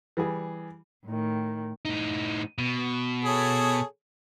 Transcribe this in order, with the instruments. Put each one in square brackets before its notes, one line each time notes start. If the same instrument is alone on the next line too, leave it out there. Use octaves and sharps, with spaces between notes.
[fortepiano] E3 G3 G#4
[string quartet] A2 D#3
[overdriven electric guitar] A2 D#4
B2
[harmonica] G#4 A4 C#5